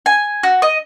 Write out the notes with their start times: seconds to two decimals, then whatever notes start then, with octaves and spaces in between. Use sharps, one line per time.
0.06 G#5
0.43 F#4
0.62 D#5